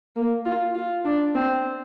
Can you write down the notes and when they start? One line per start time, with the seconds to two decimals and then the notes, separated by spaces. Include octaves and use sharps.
0.16 A#3
0.45 F4
0.75 F4
1.05 D4
1.35 C4